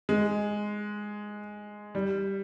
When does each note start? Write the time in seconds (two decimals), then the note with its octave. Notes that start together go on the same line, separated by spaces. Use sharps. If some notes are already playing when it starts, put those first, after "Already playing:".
0.09 G#3
1.95 G3